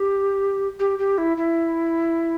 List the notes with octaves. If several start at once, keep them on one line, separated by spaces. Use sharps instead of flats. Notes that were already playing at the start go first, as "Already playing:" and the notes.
Already playing: G4
G4
G4
E4
E4